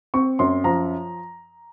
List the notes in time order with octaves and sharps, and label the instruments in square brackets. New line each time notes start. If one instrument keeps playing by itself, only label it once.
[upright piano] C4 C#6
F#2 C6
F3 A#5